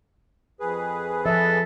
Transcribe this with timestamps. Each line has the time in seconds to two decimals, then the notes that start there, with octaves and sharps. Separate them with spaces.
0.60 F2 G#4 B4
1.26 F3 A4 C#5 E5